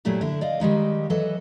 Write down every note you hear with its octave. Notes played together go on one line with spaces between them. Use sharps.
A#2 F#3 A3 E4 G4
D3 E4
D5 D#5 F5
D#3 G3 G#3 D#4
E3 F#3 B3 A4 D#5